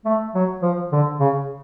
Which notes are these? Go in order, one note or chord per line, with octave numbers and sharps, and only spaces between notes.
A3
F#3
F3
D3
C#3